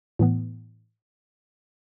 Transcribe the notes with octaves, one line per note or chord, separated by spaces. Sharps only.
A2 E3 B3